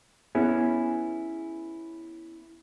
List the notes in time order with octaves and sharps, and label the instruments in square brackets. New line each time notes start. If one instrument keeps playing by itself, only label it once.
[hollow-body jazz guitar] B3 C#4 E4 G#4